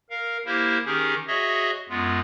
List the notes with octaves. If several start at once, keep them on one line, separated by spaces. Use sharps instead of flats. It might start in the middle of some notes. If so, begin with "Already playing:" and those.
A#4 F5
A#3 E4 G4 A#4 C5
D#3 C#4 D#4 G4 G#4 A#4
F#4 G#4 C#5 D#5 E5
F#2 G#3 B3 F4